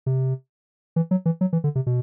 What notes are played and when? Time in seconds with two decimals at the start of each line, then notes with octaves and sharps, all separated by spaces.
0.06 C3
0.96 E3
1.11 F#3
1.26 E3
1.41 F#3
1.53 E3
1.64 D3
1.75 C3
1.87 B2